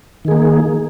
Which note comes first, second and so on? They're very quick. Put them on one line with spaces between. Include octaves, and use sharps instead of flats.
D#3 G#4 A#3